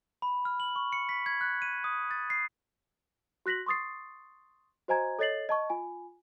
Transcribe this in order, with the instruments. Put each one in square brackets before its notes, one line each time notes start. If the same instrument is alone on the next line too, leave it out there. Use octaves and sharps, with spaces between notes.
[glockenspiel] B5
F6
F#7
C#6
C#7
B6
G#6
F#6
D#7
D#6
A6
C7
[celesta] F#4 F#6 A#6 B6 F#7
C6 C#6 D#6 A6 C7
F#4 C5 D#5 G#5 A#5 G#6
A4 C#5 D#5 A6 C7 F#7
D#5 A5 C#6
F4 G#5